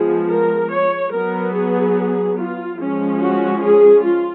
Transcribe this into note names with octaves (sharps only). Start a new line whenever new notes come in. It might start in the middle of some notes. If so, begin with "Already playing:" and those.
Already playing: F3 G#3 B3 G#4
A#4
C#5
F#3 B3 A#4
G#4
F4
F3 G#3 C#4
F#4
G#4
F4